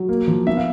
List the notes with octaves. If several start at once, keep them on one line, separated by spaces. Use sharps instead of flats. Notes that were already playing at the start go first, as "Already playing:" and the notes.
Already playing: F#3
A#3
F3
B3 E5
F5